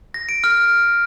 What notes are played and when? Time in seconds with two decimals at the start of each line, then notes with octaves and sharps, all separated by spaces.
0.14 A#6
0.29 D7
0.44 F6